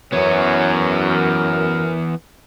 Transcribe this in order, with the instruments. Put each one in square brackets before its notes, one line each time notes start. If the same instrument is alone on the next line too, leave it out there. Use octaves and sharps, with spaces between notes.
[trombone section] F#2 [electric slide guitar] E3 B3 [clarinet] C#5
[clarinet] A#4